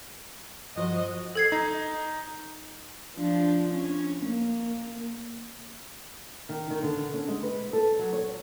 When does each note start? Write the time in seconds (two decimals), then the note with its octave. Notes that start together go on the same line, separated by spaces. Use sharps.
0.76 G2 F3 F#4 C5 D#5
1.35 A4 G#6 C7
1.52 D#4
3.17 F3 D4
3.73 C#4
4.25 A#3
6.49 D#3
6.70 D#3
6.83 D3
7.14 C#4
7.28 G#3
7.43 B4
7.73 A4
7.99 F#3
8.13 C#5